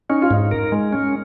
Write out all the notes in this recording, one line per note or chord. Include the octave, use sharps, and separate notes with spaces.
C#4 D#4
F4
G#2 D#4
A#4
G#3
C#4